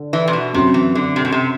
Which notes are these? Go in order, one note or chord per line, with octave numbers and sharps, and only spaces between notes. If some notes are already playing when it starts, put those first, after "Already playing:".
Already playing: D3 D5
E3
C3
B2
F#2 C3 F#3 C4
E3
D3
C3
B2
C3